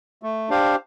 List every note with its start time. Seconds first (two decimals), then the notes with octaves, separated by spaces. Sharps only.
0.23 A3
0.49 D4 G4 C5 F5